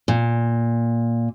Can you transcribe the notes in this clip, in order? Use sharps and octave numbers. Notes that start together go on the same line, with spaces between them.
A#2